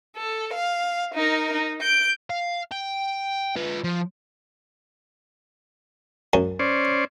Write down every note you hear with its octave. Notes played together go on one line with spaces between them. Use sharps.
A4
F5
D#4 A#4
D#4
G6 D7
F5
G5
F4 B4
F3
F#2
C#4 C5 D5